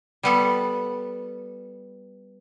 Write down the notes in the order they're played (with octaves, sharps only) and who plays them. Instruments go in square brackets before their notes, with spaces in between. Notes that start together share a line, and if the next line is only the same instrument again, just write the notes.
[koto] G3 B3 A4